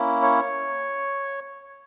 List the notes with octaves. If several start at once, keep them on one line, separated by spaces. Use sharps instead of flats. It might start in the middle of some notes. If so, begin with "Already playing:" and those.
Already playing: A#3 C#4 E4
C#5